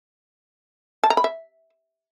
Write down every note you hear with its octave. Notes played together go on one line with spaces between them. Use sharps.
A5
A#5
B5
E5